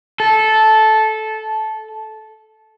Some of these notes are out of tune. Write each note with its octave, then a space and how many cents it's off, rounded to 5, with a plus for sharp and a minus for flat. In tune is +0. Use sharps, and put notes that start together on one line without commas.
A4 -15